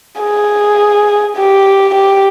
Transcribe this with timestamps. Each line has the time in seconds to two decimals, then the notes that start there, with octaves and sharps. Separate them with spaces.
0.21 G#4
1.37 G4
1.95 G4